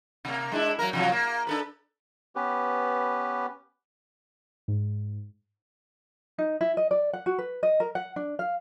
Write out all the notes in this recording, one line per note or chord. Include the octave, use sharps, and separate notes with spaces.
C3 A#3
G#3 D4 E4
F#3 A#3 A#4
C3 F3 F#3
A#3
D4 A4 B4
B3 C#4 G4 B4
G#2
D#4
E4
D#5
D5
F#5
F#4
B4
D#5
A#4
F#5
D4
F5